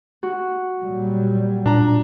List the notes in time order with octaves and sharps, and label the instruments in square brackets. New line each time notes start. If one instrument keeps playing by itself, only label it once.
[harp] F#4
[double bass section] A#2 F#3 G3
[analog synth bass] A#2 [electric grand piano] D4 A#5